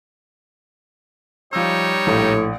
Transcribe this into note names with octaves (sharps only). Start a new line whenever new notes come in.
F3 G3 D#4 C#5 E6
A#1 A2 D#6